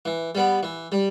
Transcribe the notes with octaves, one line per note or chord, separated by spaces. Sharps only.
E3
G3 B3
E3
G3